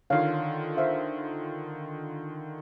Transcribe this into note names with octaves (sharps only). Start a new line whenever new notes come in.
D3 D#3 F4 C#5 F5
C5 E5 F5